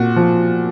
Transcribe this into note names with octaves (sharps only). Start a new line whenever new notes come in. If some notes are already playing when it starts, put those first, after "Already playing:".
Already playing: A#2 F#4
F3